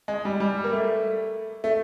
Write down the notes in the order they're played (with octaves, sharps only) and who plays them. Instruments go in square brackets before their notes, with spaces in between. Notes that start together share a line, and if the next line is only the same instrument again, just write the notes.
[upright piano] G#3
G3
G3
A#3
A3
A3